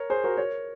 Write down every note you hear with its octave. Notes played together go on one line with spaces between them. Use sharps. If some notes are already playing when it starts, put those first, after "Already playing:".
Already playing: A#4 C#5
G#4 C5
F#4 A#4
A#4 C#5